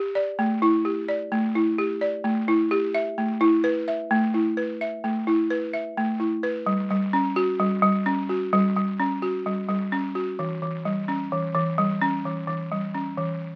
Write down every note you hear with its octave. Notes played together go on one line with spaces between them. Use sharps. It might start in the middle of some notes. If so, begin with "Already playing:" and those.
Already playing: G4
D5
A3
E4
G4
D5
A3
E4
G4
D5
A3
E4
G4
E5
A3
E4
B4
E5
A3
E4
B4
E5
A3
E4
B4
E5
A3
E4
B4
G3
G3
C#4
F#4
G3
G3
C#4
F#4
G3
G3
C#4
F#4
G3
G3
C#4
F#4
E3
E3
G3
C#4
E3
E3
G3
C#4
E3
E3
G3
C#4
E3